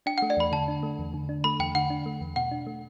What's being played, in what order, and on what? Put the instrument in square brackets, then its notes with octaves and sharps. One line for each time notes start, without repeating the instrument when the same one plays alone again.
[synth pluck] D4 [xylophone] G5
[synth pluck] A3 [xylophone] F#5
[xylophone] D5
[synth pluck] E2 [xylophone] B5
[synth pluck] D3 [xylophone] A5
[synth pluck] D4
A3
E2
D3
D4
[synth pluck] A3 [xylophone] B5
[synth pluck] E2 [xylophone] G5
[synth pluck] D3 [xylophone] F#5
[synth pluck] D4
A3
E2
[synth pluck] B2 [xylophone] F#5
[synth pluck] D4
A3